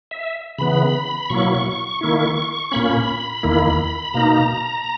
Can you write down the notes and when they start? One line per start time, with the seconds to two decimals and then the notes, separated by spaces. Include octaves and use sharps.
0.11 E5
0.58 C#3 E3 B3 B5
1.30 B2 F#3 A#3 E4 C#6
2.01 D#3 A#3 E4
2.72 A#2 A#3 C#4 B5
3.43 E2 D#3 A#3 E4
4.14 B2 A#3 D#4 A#5